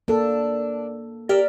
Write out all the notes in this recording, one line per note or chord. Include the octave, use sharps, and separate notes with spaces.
A#3 D4 A4
G4 A#4 D5 E5